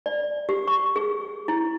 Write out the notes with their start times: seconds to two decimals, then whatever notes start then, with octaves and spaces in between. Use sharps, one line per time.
0.06 D5
0.49 G4
0.68 C#6
0.96 G#4
1.48 E4